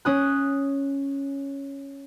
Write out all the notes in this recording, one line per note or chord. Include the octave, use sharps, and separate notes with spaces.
C#4 D#6 F#6